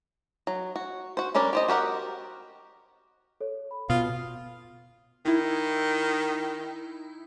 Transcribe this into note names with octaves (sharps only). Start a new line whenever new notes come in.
F#3
F#4
F#4 C5
G3 C#4 D4 A#4 D5
G4 C5 D#5
F#4 G4 A#4 F#5
A4 C#5
B5
B2 F4 D#6
D#3 D#4 E4